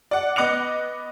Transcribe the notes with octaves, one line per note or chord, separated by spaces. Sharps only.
D5 F#5
B3 D#5 D6 F#6 C#7 F7